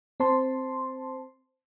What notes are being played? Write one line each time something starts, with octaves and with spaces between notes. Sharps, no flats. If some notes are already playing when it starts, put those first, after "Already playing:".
C4 C5 A5 C6